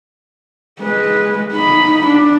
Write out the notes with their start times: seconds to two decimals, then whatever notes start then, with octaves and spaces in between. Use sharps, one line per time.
0.81 G#3 B4
1.53 D#4 B5
2.06 D4